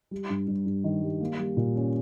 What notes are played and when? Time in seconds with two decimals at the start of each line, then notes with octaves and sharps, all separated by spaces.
0.11 G3
0.30 G2
0.47 G2
0.66 G2
0.84 D#3
1.02 G3
1.21 A#3
1.39 G3
1.57 A#2
1.75 C#4